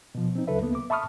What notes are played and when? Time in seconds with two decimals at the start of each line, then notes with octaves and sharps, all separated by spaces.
0.15 B2 F3
0.35 C4 D#4
0.47 D2 C#3 F#3 A4 B4 E5
0.62 D2 A#3 B3
0.75 D6
0.90 E5 A5 B5 C#6 D#6 F6